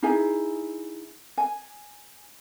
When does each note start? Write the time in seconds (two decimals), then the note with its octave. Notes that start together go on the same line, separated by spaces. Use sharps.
0.02 D#4 E4 G#4 G#5
1.38 G#5